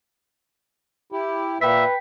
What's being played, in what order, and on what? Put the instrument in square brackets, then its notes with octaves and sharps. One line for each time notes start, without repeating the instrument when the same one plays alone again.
[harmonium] E4 G4
[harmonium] A#2 A#3 [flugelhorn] B4 [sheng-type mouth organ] E5 [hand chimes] G5 B6